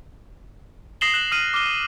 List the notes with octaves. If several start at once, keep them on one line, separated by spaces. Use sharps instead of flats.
D#6 A#6 C7 E7 F#7 G7
F#6 E7 F#7
D#6 F6 C7 D#7 F#7
D6 F6 G7